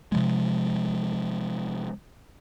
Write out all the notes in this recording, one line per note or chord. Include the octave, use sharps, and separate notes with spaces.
C3 F3 G#3